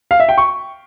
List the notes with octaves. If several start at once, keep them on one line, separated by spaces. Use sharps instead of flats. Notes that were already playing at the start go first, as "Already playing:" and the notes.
F5
E5
G5
C#6